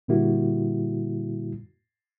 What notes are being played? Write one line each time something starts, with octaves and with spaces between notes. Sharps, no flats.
A#2 D3 G3 A#3 E4 F#4